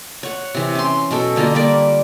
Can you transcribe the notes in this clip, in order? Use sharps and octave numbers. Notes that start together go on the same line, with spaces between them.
C#5 F#5
C3 E3
C#4 C6
B2 F#3 A4
D3 A#3 F4 A#5
G3 A#3 D5